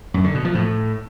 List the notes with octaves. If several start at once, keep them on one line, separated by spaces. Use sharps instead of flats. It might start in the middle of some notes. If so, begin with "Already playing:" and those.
F#2
D3
B2
F3
A2